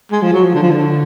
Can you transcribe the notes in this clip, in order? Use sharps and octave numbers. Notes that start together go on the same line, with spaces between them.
G#3
F3
F#3
F3
D3
F3
D3